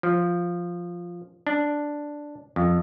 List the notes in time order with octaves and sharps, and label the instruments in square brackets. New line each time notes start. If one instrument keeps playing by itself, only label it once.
[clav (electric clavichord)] F3
D4
F2